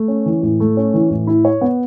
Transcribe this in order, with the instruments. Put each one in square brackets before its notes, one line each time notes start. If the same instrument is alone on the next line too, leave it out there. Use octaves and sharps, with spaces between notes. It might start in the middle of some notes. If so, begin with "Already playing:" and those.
Already playing: [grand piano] A3
C#4
E3
A2
A3
C#4
E3
A2
E4
C#5
B3